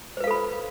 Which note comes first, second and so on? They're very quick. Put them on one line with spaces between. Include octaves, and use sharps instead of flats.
C5 B4 F5 A4 B5